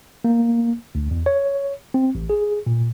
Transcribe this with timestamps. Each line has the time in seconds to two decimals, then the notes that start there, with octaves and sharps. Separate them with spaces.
0.24 A#3
0.95 D2
1.11 E2
1.26 C#5
1.94 C4
2.15 A1
2.30 G#4
2.66 A#2